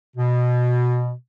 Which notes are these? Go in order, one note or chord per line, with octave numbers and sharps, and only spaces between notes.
B2